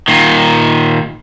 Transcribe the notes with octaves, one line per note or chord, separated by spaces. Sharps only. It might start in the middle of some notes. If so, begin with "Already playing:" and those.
A#2 D#3